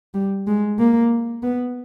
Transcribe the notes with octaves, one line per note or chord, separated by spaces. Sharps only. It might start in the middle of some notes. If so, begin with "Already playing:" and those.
G3
G#3
A#3
B3